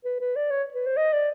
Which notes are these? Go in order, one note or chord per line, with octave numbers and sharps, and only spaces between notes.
B4
B4
D5
C#5
B4
C5
D#5
D5